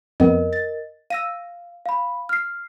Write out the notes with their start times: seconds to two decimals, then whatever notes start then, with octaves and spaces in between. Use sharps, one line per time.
0.20 F2 B3 A#4 D#5
0.53 A6
1.10 F5 E6 A#6 D#7
1.86 F5 B5
2.29 F6 C7